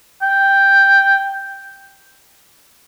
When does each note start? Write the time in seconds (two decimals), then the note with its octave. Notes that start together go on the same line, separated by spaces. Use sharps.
0.22 G5